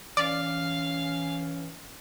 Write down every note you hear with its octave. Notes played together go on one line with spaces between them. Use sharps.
E3 C#4 D5 F5